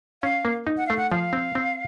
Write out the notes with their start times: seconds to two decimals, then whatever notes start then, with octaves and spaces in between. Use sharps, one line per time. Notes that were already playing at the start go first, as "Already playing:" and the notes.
0.23 C#4 F5
0.45 A#3
0.67 D#4
0.77 F#5
0.87 A3 F5
0.97 F#5
1.11 F3 F5
1.33 C4
1.55 C4